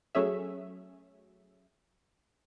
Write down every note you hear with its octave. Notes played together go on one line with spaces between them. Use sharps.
F#3 A3 C#4 G#4 E5